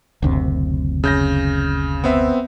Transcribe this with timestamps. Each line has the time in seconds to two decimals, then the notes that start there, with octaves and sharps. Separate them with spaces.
0.22 F#1 D2 C3
1.04 C#3 G6 A#6
2.04 B3 C4 E5